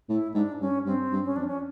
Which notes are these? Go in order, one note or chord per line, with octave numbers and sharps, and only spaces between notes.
A2 E4
G#2 D4
G2 C#4
G2 C4
G2
C#4
F2 D4
C#4